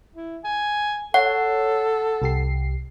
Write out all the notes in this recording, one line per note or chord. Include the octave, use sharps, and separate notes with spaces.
E4
G#5
A4 C#5 F#5
C2 G4 C7